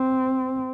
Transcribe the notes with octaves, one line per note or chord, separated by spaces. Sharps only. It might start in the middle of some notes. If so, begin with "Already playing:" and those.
Already playing: C4